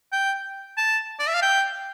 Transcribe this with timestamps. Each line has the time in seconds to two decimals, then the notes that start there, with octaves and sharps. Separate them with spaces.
0.12 G5
0.77 A5
1.19 D5
1.28 E5
1.34 F5
1.42 G5